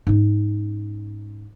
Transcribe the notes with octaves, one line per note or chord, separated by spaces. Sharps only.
G#2 C#4